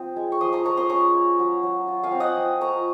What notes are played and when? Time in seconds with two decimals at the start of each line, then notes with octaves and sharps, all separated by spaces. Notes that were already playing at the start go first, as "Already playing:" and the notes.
Already playing: F3 C4 D#6
0.16 G#3
0.32 C#6
0.41 F3 C6 D#6
0.53 A#5 C#6
0.65 F3 A#5 C#6
0.77 C6 D#6
0.89 C#4 A#5 C#6
1.14 A#3
1.39 F#3
1.63 F#3
1.88 F4
2.03 F5 G#5
2.11 C4
2.20 D#5 F#5
2.36 F3
2.61 F3 A#5 C#6